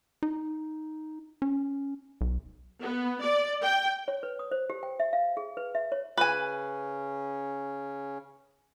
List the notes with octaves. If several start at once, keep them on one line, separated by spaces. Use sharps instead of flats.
D#4
C#4
B1
B3
D5
G5
C#5
B4
D#6
C5
G4
G5
E5
F5
G#4
B4
E5
C#5
C#3 C#4 B4 G#5